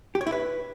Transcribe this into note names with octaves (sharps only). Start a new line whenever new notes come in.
G4
C#5
E4
B4